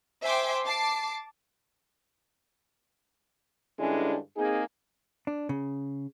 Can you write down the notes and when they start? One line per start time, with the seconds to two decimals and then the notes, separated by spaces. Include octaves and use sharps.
0.22 C5 E5 G5 G#5 C6 D6
0.66 A5 D6 C7
3.78 G2 D3 G#3 C#4 D4 E4
4.36 A#3 C4 D#4 G#4
5.27 D4
5.49 C#3